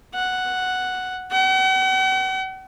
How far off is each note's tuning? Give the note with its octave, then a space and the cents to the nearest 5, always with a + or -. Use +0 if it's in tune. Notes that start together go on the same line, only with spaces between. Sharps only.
F#5 +0
F#5 +45